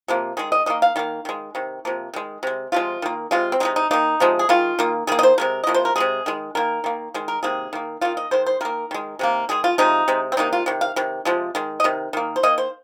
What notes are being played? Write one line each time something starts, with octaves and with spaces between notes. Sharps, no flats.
C3 F3 A#3
D#3 G#3 G#4
D#5
D#3 A#3 D#5
F5
D#3 A#3 F5
D#3 G#3
C3 D#3
C3 F3 A#3
D#3 G#3
C3 G#3
C3 F3 G#3 F4
D#3 A#3
C3 G#3 F4
C4
C3 F3 G#3 D#4
D#4
D#3 A#3 D#4
C3 F3 G#3
G#4
D#3 G#3 F4
D#3 A#3
D#3 A#3 G#4
D#5
C5
C3 F3 G#3 A#4
C3 F3 A#3 D#5
C5
A#4
C3 D#3 G#3 G#4
D#3 G#3
D#3 A#3 A#4
D#3 A#3
D#3 G#3
A#4
C3 D#3 A#3 G#4
D#3 A#3
D#3 A#3 F4
D#5
D#3 G#3 C5
C5
D#3 A#3 A#4
D#3 G#3
C3 D#3 A#3
D#3 G#3 G#4
F4
C3 F3 G#3 D#4
C3 G#3
C4
C3 D#3 A#3 D#4
F4
C3 D#3
F5
C3 D#3
C3 F3 G#3
D#3 G#3
D#5
C3 D#3
D#3 A#3
C5
D#3 A#3 D#5
C5